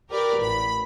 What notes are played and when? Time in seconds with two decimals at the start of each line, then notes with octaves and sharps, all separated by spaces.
0.10 G4 A#4 B4 D5 A#5
0.38 A1 B5